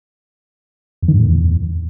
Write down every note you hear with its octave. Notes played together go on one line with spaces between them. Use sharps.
E2
D#3
G2
A2
E2